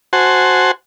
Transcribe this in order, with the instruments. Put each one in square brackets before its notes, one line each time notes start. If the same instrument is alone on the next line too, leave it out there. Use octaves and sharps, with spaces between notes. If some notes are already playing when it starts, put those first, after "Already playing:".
[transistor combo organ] F#4 C5 F#5 G#5 A5 C6